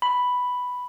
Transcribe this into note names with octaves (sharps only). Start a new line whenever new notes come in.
B5